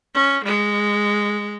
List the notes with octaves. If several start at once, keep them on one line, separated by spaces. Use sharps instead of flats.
C#4
G#3